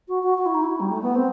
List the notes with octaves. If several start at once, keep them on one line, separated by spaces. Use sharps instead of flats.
F#4
F#4
F#4
E4
D#4
E4
G3
A3
B3
C4